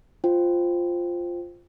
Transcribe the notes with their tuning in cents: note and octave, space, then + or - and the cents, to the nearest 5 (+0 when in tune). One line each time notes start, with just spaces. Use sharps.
F4 +0 C5 +0 G5 +0